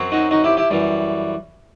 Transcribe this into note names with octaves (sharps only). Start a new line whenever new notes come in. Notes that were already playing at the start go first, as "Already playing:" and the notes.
Already playing: F#2 F#3 C4
D#4 F#4
D#4 F#4
E4 G4
E4 G4
F#2 E3 G3